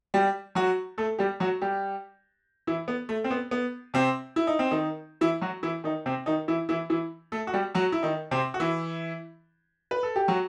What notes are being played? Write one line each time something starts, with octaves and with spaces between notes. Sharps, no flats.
G3 G4
F#3 F#4
A3 A4
G3 G4
F#3 F#4
G3 G4
E3 E4
B3
A3
C4
B3
B3
C3 C4
E4
D#4
C4
D#3 D#4
E3 E4
F#3 F#4
E3 E4
D#3 D#4
C3 C4
D#3 D#4
E3 E4
E3 E4
E3 E4
A3 A4
F#4
G3 G4
F#3 F#4
E4
D#3 D#4
C3 C4
F#4
E3 E4
B4
A4
G4
F#3 F#4